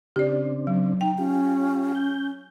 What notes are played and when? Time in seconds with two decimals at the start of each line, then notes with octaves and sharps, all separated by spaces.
0.16 C#3 C4 D4 G4 D5
0.67 F#3
1.01 D#4 G5
1.18 C#4 F4 G4
1.95 G6